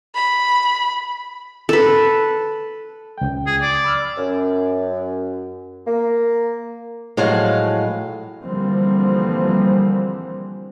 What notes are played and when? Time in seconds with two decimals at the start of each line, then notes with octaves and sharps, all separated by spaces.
0.15 B5
1.69 A4 B4
3.18 C#2 G5
3.47 G#4
3.62 D5
3.85 B5 E6 F6
4.18 F#2
5.87 A#3
7.17 A2 F3 F#3 G#3 F5
8.42 D3 E3 F3 G3 A#3 C4